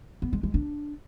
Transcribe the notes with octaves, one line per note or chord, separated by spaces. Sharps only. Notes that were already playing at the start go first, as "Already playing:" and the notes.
B3
G#3
G#3
D4